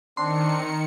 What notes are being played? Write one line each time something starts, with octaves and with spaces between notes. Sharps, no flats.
D#3 C4 D4 C6 C#7